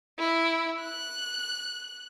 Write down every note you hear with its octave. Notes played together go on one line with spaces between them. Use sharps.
E4
F#6